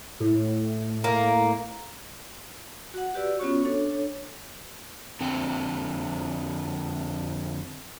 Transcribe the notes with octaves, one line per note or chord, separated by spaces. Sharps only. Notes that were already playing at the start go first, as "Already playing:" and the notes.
A2
A#3
F#4 F#5
F#4 G4 B4 D5 E6
B3 C#4 F4 F#4 C#5 C#6
D4 A4 C#5
F2 D3 C4 G5